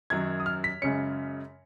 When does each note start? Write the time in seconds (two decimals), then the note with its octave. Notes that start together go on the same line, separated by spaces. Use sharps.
0.10 F#2 D#3 F#3 G#6
0.40 D#6
0.46 F6
0.64 B6
0.82 F#2 C#3 G#3 C#4 C#7